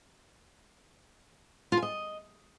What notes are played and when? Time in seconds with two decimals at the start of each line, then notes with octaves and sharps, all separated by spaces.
1.72 F4
1.77 G#5
1.82 D#5